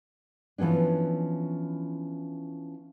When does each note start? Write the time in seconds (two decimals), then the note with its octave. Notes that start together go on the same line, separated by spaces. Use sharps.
0.58 E3 F3 B3 C#4 D4